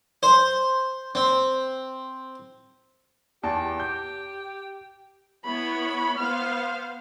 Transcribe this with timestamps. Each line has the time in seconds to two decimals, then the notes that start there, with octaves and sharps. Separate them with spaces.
0.23 C5
1.15 C4
3.44 E2 G4 A5
3.80 G6
5.45 B3 E4 C#5 B5
6.18 B3 C5 F5 F6